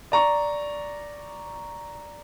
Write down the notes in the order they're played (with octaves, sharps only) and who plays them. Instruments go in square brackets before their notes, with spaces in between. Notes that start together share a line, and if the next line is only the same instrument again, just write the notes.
[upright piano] D5 A#5 C#6